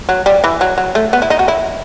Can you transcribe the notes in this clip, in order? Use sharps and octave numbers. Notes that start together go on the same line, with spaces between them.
F#3
G3
E3
F#3
F#3
A3
B3
E4
D#4
F#4
E4